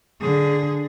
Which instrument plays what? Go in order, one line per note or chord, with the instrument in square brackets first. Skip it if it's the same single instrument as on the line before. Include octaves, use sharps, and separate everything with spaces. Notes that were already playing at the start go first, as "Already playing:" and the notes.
[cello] D3 G#4